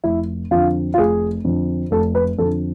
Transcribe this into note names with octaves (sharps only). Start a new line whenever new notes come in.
F1 E4
F2 D3 F4
F4
F1 G#4
F2 D3
F1 A4
B4
F2 D3 A4